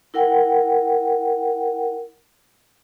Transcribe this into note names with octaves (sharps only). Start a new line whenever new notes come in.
E4 A#4 F#5 G5